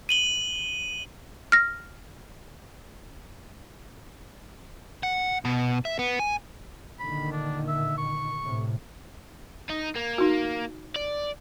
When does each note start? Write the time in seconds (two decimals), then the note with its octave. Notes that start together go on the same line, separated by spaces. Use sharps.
0.09 D#7 F#7 G7
1.52 F6 A#6
5.03 F#5
5.45 B2
5.85 E5
5.99 B3
6.19 G#5
6.99 A#2 D3 D#3 B5
7.32 D4
7.68 E5
7.98 C#6
8.42 A2 C3
9.70 D#4
9.96 A#3
10.18 D#4 F#4
10.96 D5